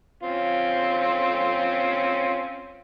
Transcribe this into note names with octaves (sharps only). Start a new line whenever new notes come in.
C4 C#4 F4